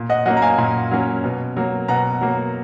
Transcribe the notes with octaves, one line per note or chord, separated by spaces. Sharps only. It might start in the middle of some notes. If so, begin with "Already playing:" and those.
Already playing: A#2
D#5 F#5
F#3 A#3 C#4 D#5 F#5
A#5
F5 G#5
A#2
F#3 A#3 C#4
B2
F#3 A#3
B2 F#5 A#5
F#3 A#3